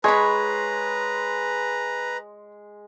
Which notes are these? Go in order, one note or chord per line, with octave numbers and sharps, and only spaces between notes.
G#3 B4 C#5 A#5 B5